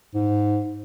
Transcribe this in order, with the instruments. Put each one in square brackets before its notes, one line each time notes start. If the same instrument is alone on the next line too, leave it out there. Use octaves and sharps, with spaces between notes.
[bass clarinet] G#2